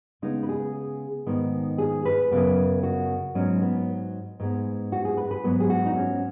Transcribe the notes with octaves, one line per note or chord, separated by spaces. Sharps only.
C#3 G#3 B3 D#4
B4
G#4
G#2 D#3 B3
G#4
B4
F#2 C#3 B3
F#4
G#2 F#3 B3 C#4
B3
G#2 G#3 B3
F#4
G#4
B4
B4
G#2 F#3 B3
G#4
F#4
D#4
C#4